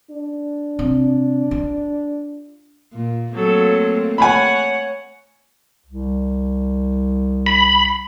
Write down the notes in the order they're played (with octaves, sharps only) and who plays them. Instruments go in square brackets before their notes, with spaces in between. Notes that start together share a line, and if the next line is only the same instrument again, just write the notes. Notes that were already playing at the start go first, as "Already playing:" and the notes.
[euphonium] D4
[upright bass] C3
F4
[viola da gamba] A#2
[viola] F#3 A4 [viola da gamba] A3 A#3 C4
[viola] C#5 F#5 [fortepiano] G#5 B5
[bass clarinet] C2
[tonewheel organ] B5